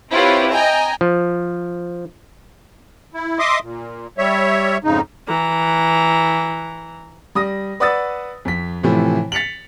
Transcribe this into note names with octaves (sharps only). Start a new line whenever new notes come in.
C4 E4 F4 G4 B4 C#5
D#5 G5 G#5 A#5
F3
E4
D#5 E5 C6 D6 D#6
A#2
G3 C#5 E5
F2 G#2 C#3 D#4
E3 A#5
G3 D#6 A#6
B4 D5 F#5 D#6 E6 A6
F2 B6
A2 C3 E3 F3
A6 B6 C#7 F7 F#7